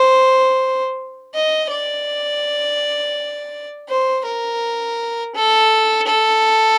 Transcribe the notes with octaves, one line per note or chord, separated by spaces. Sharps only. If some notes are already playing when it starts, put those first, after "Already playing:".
Already playing: C5
D#5
D5
C5
A#4
A4
A4